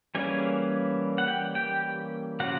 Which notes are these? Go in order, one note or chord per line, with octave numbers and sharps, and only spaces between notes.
E3 G3 A#3 C#4 G#4 G#5
F#5
G4 G5
G4 G5
C#3 F3 A#3 C#4 F#4 F#5